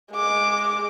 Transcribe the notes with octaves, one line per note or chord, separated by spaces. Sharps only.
G#3 D6